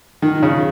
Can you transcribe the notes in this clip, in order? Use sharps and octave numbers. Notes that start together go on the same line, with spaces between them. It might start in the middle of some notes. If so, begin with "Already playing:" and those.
D#3
C#3